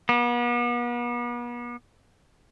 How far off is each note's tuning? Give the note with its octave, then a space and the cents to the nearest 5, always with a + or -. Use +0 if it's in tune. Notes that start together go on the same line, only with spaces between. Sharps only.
B3 -40